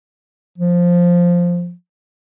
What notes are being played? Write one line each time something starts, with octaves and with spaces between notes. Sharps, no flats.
F3